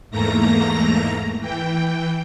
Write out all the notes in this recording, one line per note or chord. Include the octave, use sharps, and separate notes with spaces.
E2 G#2 A3 A#3 A#5 A#6
E3 G5